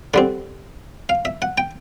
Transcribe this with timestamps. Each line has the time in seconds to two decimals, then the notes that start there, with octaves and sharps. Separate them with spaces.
0.14 D3 G3 C4 F#5
1.09 F5
1.25 E5
1.42 F#5
1.58 G5